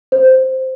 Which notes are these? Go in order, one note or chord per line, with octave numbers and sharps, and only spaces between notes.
C5